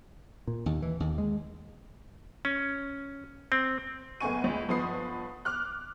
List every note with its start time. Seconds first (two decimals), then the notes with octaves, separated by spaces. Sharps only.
0.47 A#2
0.66 D#2
0.82 E3
1.00 D#2
1.18 G#3
2.45 C#4
3.52 C4
4.20 F#1 A3 B3 G#5 C#6 D#7
4.44 C#2
4.68 G1 F3 B3 B4 D#6 C7
5.45 D6 F6 F#6